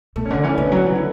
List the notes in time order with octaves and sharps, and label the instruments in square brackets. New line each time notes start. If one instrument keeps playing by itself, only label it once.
[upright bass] B2 [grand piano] A3
[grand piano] C#4
[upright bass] D3 [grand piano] D4
[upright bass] E3 [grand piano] C#4
[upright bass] D3 [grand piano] B3
[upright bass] F#3
E3
D3